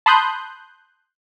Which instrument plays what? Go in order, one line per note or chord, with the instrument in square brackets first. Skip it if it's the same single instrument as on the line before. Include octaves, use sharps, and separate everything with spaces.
[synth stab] A5 B5 C6 D#6 F#6 G6